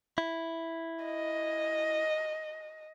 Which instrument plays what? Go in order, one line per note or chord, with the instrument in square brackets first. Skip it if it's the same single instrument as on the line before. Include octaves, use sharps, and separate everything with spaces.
[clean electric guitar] E4
[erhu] D#5